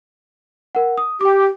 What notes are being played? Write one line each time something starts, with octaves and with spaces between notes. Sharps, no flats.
A#4 F#5
D#6
G4 G5 D6